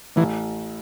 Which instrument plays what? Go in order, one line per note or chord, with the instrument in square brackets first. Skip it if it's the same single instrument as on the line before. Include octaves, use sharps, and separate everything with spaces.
[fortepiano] A1 [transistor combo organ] E3